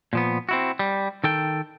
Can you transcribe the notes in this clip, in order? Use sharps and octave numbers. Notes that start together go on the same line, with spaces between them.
A#2 F3 B3
C4 E4 F#4
G3
D#3 A4 G5